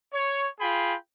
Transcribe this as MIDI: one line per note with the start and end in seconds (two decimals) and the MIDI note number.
0.13 0.48 73
0.60 0.94 65
0.60 0.94 68
0.60 0.94 79
0.60 0.94 83